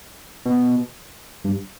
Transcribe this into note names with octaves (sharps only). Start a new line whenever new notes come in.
B2
G2